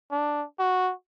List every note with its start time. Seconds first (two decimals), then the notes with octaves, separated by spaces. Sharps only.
0.12 D4
0.59 F#4